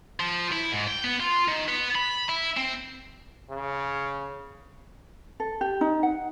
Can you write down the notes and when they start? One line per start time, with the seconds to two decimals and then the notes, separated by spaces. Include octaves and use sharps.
0.20 F3
0.52 E4
0.72 G#2
0.88 G5
1.04 B3
1.20 F4
1.48 D#3
1.69 B3
1.95 B5
2.29 E4
2.57 C4
3.50 C#3
5.40 A4
5.61 G4
5.81 D#4
6.03 F#5